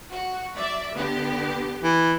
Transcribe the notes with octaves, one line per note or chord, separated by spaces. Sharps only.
F#4
F#3 D5 E5
D3 B3 G4
E3